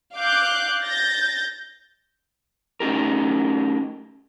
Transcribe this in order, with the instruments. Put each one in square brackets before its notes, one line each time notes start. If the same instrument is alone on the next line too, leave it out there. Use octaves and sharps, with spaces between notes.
[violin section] F5 D6 F#6 G6
G6 A6 A#6
[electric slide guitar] A3 C#4 D#4 G4 A#4